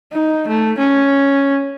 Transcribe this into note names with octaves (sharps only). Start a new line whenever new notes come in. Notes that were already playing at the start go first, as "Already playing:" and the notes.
D#4
A3
C#4